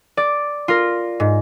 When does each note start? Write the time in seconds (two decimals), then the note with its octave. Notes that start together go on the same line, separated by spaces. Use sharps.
0.17 D5
0.68 F4 A#4
1.20 G#2